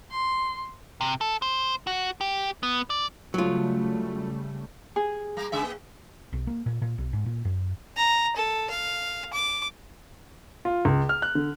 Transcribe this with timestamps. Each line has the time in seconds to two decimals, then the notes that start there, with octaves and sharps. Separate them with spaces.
0.11 C6
1.01 C3
1.21 A4
1.42 C5
1.87 F#4
2.21 G4
2.63 B3
2.90 D5
3.34 C#3 F#3 G3 A3 F4
4.96 G#4
5.37 G3 A#3 A#4
5.52 C#3 G#3 E5
5.64 A#3
6.33 B1
6.47 A#3
6.66 A#2
6.82 A#2
6.98 B1
7.13 G#2
7.26 A#2
7.45 F#2
7.97 A#5
8.36 A4
8.70 F5
9.33 D6
10.65 F4
10.85 C#2
11.09 F6
11.22 F#6
11.35 D3